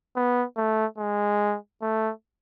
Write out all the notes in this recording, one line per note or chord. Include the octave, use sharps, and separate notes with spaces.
B3
A3
G#3
A3